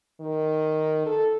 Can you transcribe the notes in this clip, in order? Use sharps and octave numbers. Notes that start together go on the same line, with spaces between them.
D#3
A4